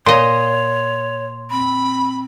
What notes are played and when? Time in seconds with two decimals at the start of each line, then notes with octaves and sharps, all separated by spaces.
0.06 A#2 C#5 D#5 C6
1.51 C4 B5